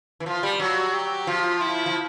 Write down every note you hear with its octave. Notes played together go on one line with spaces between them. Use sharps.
E3
F3 F4
G3
F#3 F#4
G4
F3 F4
E4
F3